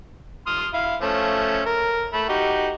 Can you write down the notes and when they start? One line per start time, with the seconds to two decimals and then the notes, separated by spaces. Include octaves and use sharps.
0.47 C6 D#6 F6
0.74 E4 F5
1.02 F3 A3 C#4
1.66 A#4
2.13 A3 B5
2.29 D#4 F#4 G4